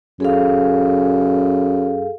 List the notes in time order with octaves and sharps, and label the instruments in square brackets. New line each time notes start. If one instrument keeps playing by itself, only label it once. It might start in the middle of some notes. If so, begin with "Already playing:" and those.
[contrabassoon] F#2 [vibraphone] G#4 A4 F5